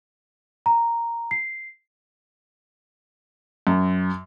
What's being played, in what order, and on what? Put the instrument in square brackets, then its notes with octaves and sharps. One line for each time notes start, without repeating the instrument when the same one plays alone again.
[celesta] A#5
C7
[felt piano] F#2